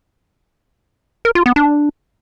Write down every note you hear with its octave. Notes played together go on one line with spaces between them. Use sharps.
A#4
F4
B3
D4